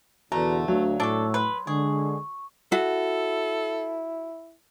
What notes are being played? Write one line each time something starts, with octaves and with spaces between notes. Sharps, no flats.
E2 B2 D3 A3 F#4 B4 A#5
D2 F#3 F5
A2 D4 A4 C#6 E6
B4 C6
D3 G#3 G#4 C#6
E4 F#4 A4